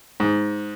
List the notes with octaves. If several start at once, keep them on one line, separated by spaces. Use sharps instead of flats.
G#2